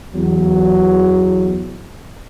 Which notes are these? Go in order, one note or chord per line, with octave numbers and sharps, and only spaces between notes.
E2 F#3